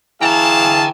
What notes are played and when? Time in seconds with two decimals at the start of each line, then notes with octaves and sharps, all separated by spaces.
0.21 E3 G#4 F5 G5 A5 A#5